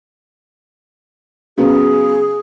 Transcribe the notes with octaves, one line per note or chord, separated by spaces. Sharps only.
C#3 F#3 B3 G#4